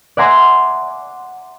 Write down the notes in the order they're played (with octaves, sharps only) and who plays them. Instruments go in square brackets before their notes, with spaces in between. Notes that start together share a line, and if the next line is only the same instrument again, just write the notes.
[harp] D5 E5 F#5 G#5 A#5 C6